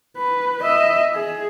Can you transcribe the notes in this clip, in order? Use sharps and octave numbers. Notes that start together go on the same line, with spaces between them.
B4
D#5 E5
G#4